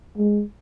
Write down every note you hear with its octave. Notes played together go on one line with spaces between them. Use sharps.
G#3